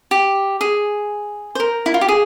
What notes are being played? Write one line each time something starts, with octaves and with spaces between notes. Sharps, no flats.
G4
G#4
C5
A#4
E4
F4
G4
G#4